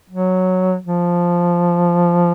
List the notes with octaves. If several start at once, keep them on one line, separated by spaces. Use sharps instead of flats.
F#3
F3